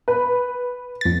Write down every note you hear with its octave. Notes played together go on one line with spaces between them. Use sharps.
B4
F2 A6